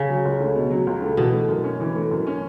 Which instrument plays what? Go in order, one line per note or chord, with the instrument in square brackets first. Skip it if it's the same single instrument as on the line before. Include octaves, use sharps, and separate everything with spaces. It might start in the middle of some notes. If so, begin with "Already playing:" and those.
Already playing: [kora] C#3
[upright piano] F#3
C#2
A3
B2
F#3
C#2
A3
[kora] B2 [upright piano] E3
[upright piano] A3
F#2
C#4
E3
A3
F#2
C#4